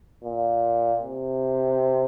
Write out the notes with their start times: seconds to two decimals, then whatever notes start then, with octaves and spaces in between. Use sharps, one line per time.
0.24 A#2
1.02 C3